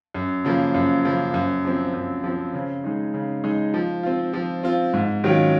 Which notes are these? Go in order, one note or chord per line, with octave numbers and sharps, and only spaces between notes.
F#2
C#3 F3 A#3
F#2
C#3 F3 A#3
F#2
F3 C4
F#2
F3 C4
C#3
G#3 D#4
C#3
G#3 D#4
F3
C4 F4
F3
C4 F4
G#2
D#3 F#3 C#4 F4